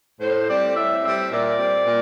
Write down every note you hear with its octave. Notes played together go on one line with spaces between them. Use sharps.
A2 C5
G3 C4 D5
A2 E5
G3 C4 E5
A#2 D5
G3 C4
A#2